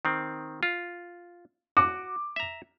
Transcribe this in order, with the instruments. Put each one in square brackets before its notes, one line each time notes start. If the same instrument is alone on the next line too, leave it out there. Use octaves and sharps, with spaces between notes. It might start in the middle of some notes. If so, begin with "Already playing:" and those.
[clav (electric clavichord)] D#3 C4
F4
[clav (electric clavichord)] F#4 [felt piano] D6
[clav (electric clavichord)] E5 A#5